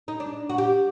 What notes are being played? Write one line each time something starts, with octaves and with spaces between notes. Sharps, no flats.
D#4
D4
F#4
G4